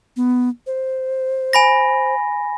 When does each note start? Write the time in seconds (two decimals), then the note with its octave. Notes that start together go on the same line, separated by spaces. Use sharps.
0.17 B3
0.67 C5
1.53 G#5 B5 A#6